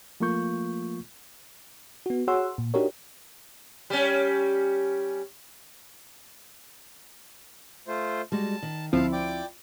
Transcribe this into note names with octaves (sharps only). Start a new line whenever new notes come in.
F3 A3 A#3 F4 C#6 G6
B3 F#4
F#4 G#4 C#5 F#5 C6 E6
A#2
D4 D#4 F#4 G4 A#4 C#5
G3 C#4
A3 F4 C5
G3 G#3 F#4 A5
D#3
D2 F3 C4 E4 F4 F5 A5
D5 G5 D6